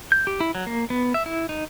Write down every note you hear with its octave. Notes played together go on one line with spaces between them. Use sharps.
G6
G4
E4
F#3
A#3
B3
E5
E4
D#4